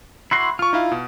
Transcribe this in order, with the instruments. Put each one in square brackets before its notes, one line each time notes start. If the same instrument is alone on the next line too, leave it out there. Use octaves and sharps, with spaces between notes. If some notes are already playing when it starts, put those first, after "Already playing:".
[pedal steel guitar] E4 F#4 C6
[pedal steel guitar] F4 [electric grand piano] C#6 F6
[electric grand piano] D#4 E4 F5
B2